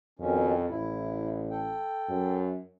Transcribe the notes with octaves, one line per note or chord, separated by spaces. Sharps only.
F2 B2 D#3 C#4
A1 E4
A4 G5
F#2